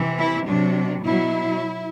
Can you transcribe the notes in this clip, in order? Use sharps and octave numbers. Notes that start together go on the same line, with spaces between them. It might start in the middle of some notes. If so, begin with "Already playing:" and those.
Already playing: C3 E3
E4
C3 F#3 D4
B2 F#3 E4